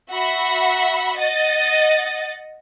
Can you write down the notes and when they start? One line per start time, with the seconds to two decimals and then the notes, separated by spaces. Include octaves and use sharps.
0.12 F#4 E5 F#5 B5
1.18 D#5 F#5 A6